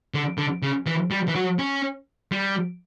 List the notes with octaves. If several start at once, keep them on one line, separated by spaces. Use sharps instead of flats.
D3
D3
C#3
E3
G3
E3
F#3
C#4
G3